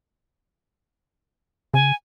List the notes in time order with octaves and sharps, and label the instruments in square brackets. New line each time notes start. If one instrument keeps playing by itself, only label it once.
[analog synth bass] C#3 [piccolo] G#5